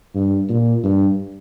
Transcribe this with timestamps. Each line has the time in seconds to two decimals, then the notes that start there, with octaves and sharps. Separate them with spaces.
0.15 G2
0.49 A#2
0.84 G2